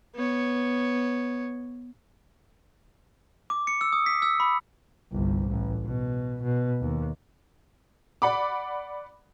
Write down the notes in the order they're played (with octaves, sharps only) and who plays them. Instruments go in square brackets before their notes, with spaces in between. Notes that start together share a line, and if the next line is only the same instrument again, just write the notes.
[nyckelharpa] B3 C#5
[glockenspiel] D6
C#7
E6
D#6
B6
E6
B5
[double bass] G1 C2
A1
B2
B2
D#2
[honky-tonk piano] D5 F#5 B5 D6